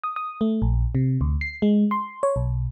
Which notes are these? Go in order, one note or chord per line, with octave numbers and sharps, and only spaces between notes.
D#6
D#6
A3
A#1
C3
D2
C7
G#3
C6
C#5
B1